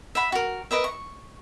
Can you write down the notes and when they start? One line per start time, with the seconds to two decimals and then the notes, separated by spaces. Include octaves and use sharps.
0.15 E5 F#5 B5
0.32 F#4 A#4
0.71 A#4 B4 D#5 E5
0.84 C#6